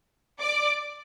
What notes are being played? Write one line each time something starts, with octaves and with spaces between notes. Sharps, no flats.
D5 D6